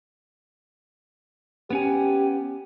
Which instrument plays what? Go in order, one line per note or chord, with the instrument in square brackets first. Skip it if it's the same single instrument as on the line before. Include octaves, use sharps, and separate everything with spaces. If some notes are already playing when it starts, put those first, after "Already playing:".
[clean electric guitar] B3 C#4 G#5 [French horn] G4